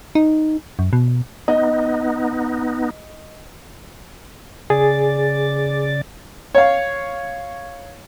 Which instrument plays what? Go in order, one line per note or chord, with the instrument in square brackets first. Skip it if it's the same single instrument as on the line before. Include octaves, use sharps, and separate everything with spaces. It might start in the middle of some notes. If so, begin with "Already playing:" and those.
[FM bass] D#4
F#2
B2
[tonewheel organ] B3 D#4 [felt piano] D#5
[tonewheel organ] C#3 D5 A6 [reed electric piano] G#4
[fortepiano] C#5 F5